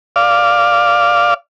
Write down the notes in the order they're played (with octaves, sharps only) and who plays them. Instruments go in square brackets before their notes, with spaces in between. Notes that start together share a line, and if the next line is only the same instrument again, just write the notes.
[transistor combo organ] D5 F5